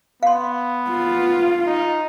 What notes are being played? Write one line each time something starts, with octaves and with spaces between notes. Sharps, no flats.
B3 F5 C6
F4
D#4